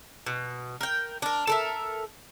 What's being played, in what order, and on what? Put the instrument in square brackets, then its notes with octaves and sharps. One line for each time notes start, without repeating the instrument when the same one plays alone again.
[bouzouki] B2
A#4 G5
D4 A#4
A4 A#4 E5